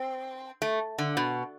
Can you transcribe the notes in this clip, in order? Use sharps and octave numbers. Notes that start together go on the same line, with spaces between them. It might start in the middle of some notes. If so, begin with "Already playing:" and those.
Already playing: C4
A3
D3
B2